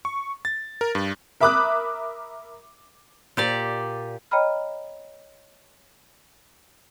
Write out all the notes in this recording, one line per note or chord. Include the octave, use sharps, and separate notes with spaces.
C#6
A6
A#4
G2
A#4 E5 B5 D6 D#6 F#6
A#2 G4 D5
C#5 D#5 G5 A#5 B5 F6